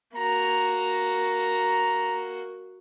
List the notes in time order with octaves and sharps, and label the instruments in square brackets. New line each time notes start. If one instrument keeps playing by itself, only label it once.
[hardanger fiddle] A#3 F#4 [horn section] A#5